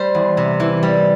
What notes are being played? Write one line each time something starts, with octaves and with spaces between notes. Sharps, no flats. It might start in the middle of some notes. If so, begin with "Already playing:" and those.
Already playing: G3 C5
E2
C3
E3
G3